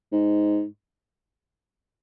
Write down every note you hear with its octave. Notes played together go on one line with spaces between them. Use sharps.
G#2